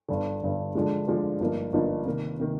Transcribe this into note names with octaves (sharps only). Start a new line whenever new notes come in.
G1 G2 D3
G1 G2 D3
D3 F3 G#3 D4
D3 F3 G#3 D4
G1 G2 F3 A#3 D#4
G1 G2 F3 A#3 D#4
C3 D#3 A#3
C3 D#3 A#3